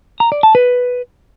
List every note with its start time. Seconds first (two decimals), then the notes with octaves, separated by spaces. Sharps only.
0.20 A#5
0.32 D5
0.43 A5
0.55 B4